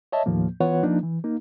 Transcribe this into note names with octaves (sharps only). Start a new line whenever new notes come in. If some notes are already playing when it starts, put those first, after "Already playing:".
C#5 D#5 E5 A5
D#2 A2 F3 A#3
E3 B3 F4 B4 C#5 F#5
F3 A#3 D4 D#4
E3
A#3 D#4